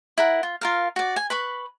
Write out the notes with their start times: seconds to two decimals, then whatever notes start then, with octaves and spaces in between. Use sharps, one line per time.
0.18 E4 A#4 F#5
0.43 F4
0.61 F4 A#4 F5
0.96 F#4 D5
1.16 G#5
1.30 B4 B5 C#6